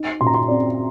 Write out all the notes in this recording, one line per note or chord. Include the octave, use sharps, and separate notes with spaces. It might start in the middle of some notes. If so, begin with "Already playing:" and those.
Already playing: D#4
A#2 C6
A#5
C6
C4 D5